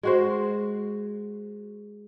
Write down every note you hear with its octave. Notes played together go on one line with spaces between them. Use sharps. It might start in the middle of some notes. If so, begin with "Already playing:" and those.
G#3 F#4 C5